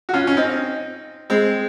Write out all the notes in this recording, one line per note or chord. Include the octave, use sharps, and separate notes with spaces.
F#4
C#4 F4
C#4
C4 D#4
G#3 C4